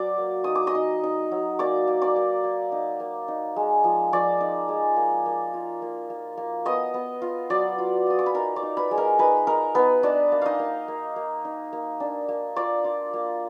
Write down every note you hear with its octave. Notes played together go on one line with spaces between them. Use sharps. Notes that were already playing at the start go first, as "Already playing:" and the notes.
Already playing: F#3 D5 D6
A#3
D#4 D#6
D6
D#5 D#6
D#4
D#4
F#3
A#3 D5 D6
A#3
D5 D6
A#3
A#3
D#4
A#3
D#4
G#3
F3
F3 D5 D6
D#4
G#3
A#3
A#3
F4
A#3
A#3
A#3
B3 D#5 D#6
B3
F4
F#3 D5 D6
F4
F4 D#6
D6
B5
D#4 A#4 A#5
D5 D6
D#4
B4 B5
G#3
A#4 A#5
D#4 B4 B5
D#4 A#4 A#5
B3 D#4 B4
D4 D#4 D5
A#3
D#4 D#5 F5
A#3
A#3
A#3
D#4
A#3
D4
A#3
F4 D5 D6
F4
A#3